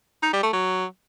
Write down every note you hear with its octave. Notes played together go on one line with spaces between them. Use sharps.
D#4
G3
A3
F#3